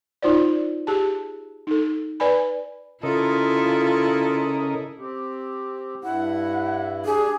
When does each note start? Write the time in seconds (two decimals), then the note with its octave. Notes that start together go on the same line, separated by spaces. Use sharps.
0.22 D#4 F4 C5 D5
0.87 G4 G#4 A5
1.67 D#4 A4
2.20 B4 D5 G#5 B5
3.03 C#3 E4 F4 A4 A#4 D#5
4.99 C4 G4
6.04 G2 E4 F#5
7.05 D4 G4 G#4